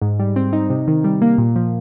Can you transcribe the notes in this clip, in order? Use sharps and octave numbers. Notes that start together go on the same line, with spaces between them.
G#2
G3
C4
D#4
C3
D#3
G3
A#3
A#2
F3